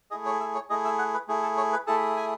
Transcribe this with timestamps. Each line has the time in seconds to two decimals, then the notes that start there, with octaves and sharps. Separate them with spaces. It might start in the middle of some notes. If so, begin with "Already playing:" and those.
0.11 A3 E4 G#4 D#5
0.26 C#5
0.40 E5
0.55 C#5
0.70 A3 E4 G#4 D#5
0.85 E5
0.99 F#5
1.14 B4
1.28 A3 E4 G#4
1.43 A4
1.57 C#5
1.73 B4
1.87 A3 E4 G#4 A4
2.16 G#5